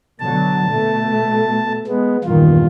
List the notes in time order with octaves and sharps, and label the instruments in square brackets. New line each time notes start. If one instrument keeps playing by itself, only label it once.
[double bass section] B2 D3 F#3 [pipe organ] A5
[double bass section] B2 A3
[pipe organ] G#3 B3
[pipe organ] E2 G2 F4 [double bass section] A#2 D#3